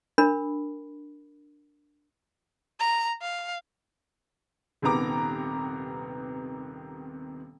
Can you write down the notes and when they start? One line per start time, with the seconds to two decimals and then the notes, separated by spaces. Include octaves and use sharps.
0.18 D4 A#4 B5
2.80 A#5
3.22 F5
4.82 D#1 C3 D#3 B3 A#5 D6